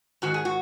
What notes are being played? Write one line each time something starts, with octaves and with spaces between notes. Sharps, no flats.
G#2 D#3 F#4
G#4
F#4